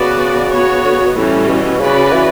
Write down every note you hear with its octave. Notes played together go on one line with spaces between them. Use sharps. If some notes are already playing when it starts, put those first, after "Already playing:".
Already playing: C#3 B3 F#4 B4 D5
B3 F#4 C#5
D3
C#3
B2
A2 E3 G3 C#4
B2
C#3 C#4 F#4 B4 D5
E3